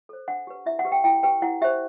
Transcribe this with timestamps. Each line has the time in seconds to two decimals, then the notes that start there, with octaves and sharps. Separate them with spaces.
0.09 A4 C5
0.28 D4 F#5
0.47 G4 B4
0.66 E4 E5
0.79 F#5
0.85 G4 B4
0.92 G5
1.04 E4 G5
1.23 G4 B4 G5
1.42 E4 F#5
1.62 G4 C5 E5